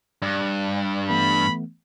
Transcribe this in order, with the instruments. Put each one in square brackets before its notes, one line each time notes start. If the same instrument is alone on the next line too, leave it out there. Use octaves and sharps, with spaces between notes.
[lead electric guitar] G2 [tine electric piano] D5 F#6
[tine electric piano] E3 A3 B3 [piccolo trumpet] B5